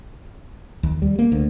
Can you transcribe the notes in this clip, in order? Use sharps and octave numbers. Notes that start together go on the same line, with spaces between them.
D#2
G3
A#3
D2